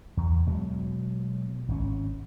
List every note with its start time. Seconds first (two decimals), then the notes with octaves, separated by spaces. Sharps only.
0.17 E2
0.47 B2 F#3 G#3
1.68 G#1 C#4